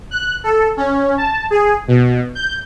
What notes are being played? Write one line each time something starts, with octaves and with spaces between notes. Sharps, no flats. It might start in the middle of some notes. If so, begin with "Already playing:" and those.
F#6
A4
C#4
A5
G#4
B2
G6